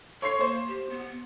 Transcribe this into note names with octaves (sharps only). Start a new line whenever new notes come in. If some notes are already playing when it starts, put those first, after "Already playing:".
A4 C#5 C6 C7
A#3 C5
G4
B3